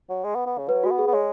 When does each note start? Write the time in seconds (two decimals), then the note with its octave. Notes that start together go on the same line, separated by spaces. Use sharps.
0.09 F#3
0.24 G#3
0.35 B3
0.46 B3
0.58 C#3
0.69 F#3 B4
0.84 G#3 F#4
0.91 B3
0.98 G#4
1.07 B3
1.13 G#3 C#5